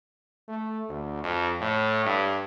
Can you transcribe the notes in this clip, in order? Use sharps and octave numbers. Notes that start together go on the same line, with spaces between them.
A3
D2
F2
A2
G2